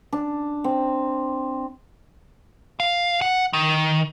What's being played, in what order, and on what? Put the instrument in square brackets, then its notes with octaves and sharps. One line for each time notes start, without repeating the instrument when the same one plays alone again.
[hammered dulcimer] D4
C4
[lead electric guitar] F5
F#5
D#3